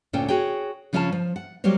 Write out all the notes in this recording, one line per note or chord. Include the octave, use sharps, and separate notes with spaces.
D2 A#2 C#4 A4 G5
F#4 G#4 C#5 G5
C#3 F3 C#4 F5 G#5 A5
F3
F#5
F#3 G3 A#3 C5 C#5